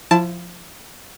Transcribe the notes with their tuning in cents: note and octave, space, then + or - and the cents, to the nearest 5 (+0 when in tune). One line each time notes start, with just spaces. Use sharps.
F3 +10 E4 +35 A5 +0